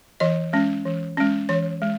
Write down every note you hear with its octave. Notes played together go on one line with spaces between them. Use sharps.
E3 D#5
G#3 C#4
E3
G#3 C#4
E3 C#5
G#3